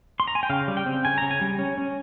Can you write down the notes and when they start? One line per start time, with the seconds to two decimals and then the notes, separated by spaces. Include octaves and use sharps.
0.20 C6
0.28 A#5
0.35 G#5
0.43 G5
0.50 C#3 F5
0.68 G3
0.77 G5
0.86 C4
1.05 C#3 G#5
1.18 C#3 A#5
1.31 G#5
1.41 G3
1.59 C#4
1.78 C#4